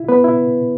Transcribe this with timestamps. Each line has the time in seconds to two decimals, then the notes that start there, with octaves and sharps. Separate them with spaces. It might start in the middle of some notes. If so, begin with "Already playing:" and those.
Already playing: E4
0.09 B3 B4
0.24 E4